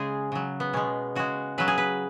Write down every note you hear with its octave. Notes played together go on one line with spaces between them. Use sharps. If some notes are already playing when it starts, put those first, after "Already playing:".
Already playing: C#3 G#3 G#4
C#3 F#3
B3
B2 G#3 C#4
C#3 G#3 F#4
C#3 F#3 B4
G#4
B4